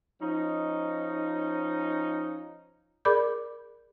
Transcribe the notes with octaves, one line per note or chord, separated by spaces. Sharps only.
F3 C#4 D#4
G#4 A#4 D5 B5 D6 G6